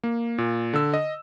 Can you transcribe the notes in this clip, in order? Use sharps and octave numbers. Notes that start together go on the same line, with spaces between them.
A#3
A#2
D3 E6
D#5